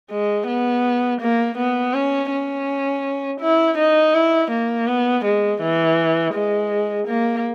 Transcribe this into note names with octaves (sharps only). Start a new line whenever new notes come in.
G#3
B3
A#3
B3
C#4
C#4
E4
D#4
E4
A#3
B3
G#3
E3
G#3
A#3